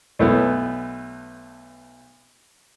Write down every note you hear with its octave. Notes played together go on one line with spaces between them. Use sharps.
B1 A3 B3